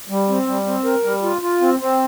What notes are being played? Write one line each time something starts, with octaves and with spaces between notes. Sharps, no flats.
G3
C4
G3
C4
A#4
G3
F4
F4
C4
C4